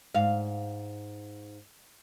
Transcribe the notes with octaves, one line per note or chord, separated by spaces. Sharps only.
G#2 F5